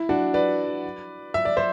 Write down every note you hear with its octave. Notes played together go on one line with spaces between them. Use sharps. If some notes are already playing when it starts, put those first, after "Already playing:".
Already playing: E4
D4 F#4
B4 D5
E5
D5
C5 E5